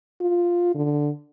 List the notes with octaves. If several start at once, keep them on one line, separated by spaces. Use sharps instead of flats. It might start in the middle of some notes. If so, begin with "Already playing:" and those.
F4
D3